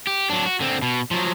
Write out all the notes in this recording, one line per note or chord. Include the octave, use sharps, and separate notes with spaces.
G4
F#3 D4
F#4
D3 C4
B2
F3 F#3